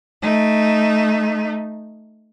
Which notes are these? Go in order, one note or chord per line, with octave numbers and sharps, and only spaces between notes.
A3 D#4